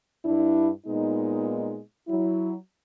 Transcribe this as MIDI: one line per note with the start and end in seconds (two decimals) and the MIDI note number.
0.24 0.69 43
0.24 0.69 62
0.24 0.69 64
0.86 1.79 46
0.86 1.79 56
0.86 1.79 59
0.86 1.79 63
2.08 2.55 54
2.08 2.55 64